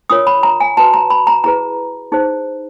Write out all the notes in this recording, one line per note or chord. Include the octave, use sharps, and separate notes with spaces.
D4 F4 A#4 C#5 D#6
B5
A#5
G#5
F#4 B4 A5
A#5
B5
A#5
E4 G#4 B4 A#5
D#4 G#4 C5